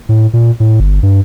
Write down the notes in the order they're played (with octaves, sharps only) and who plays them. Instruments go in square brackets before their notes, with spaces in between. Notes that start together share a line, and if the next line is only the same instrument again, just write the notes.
[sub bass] A2
A#2
A2
G1
G2